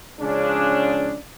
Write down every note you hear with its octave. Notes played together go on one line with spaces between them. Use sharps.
C#3 F3 G#3 C#4 D4